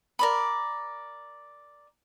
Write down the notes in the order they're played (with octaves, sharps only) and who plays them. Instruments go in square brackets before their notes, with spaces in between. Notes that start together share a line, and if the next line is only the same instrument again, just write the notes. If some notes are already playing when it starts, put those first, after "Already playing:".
[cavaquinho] A#4 D5 B5